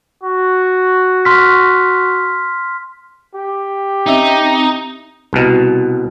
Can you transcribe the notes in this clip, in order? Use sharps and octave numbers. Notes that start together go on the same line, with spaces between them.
F#4
C6 F6 B6
G4
C4 C#4 D#4 D#5 E5
C2 B2